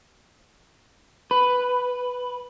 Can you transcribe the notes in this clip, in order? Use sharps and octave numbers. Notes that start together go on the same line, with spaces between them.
B4